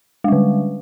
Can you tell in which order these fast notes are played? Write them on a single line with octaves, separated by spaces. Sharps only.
G#3 G3 D3